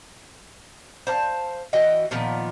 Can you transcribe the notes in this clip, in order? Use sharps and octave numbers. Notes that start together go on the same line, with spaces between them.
C5 F5 A5
E3 F#4 D#5 G5
A#2 D#3 F3 B3